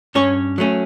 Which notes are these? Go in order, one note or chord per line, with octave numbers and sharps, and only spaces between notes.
G2 C#4 C#5
F#3 A3 C#4